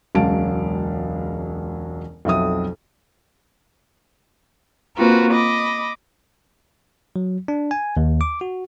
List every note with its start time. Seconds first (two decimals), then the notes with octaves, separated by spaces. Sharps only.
0.15 E1 C#2 F#3 F5 A5 D7
2.25 B1 F2 E5 D#6
4.97 A#3 C4 F4 F#4 A#4 B4
5.32 D#5 B5 D6
7.16 F#3
7.48 D4
7.71 G#5
7.97 D#2
8.21 D6
8.41 F#4